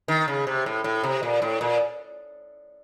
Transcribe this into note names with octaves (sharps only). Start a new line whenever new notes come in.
D#3
C#3
C3
A2
A2
C3
A#2
A2
A#2